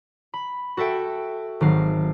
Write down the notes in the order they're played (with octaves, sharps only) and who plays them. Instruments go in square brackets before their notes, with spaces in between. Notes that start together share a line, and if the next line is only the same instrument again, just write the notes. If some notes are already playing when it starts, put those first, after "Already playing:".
[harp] B5
F#4 A4 E5 G5
G#1 F#3 F5